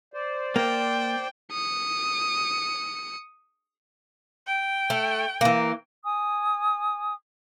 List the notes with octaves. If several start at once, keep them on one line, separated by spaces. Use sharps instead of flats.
C5 D5
A#3 G5
D#6 C#7
G5
A3
E3 A#3
G#5 D#6